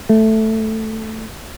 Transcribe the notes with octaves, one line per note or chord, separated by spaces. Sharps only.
A3